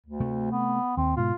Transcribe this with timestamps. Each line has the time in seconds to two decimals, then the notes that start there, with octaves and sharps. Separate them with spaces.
0.06 D2
0.20 C3 A3
0.52 B3
0.97 D#2 C4
1.17 G#2 B2 F4